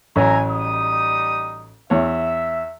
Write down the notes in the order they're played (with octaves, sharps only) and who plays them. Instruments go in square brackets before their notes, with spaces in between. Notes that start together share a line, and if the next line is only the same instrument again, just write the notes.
[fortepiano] A1 F#3 [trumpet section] E5 G#5 A#5
[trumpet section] G3 D#4 D#6
[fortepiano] E2 C#5 [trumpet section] E5